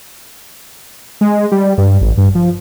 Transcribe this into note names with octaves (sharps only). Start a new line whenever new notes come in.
G#3
G3
G2
A1
G2
F3